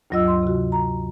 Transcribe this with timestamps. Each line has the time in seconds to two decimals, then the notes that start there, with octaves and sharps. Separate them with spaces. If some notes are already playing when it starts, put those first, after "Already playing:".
0.10 D2 G2 F#3 F4 D#5 E6
0.28 C6
0.43 C3 F#4
0.72 A#5